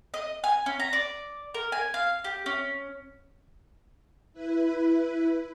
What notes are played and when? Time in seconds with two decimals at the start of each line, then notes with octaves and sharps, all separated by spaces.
0.14 D#5
0.44 G#5
0.66 C#4
0.80 A#5
0.93 D5
1.54 A#4
1.72 G#5
1.94 F5
2.24 G4
2.46 C#4
4.33 E4 B4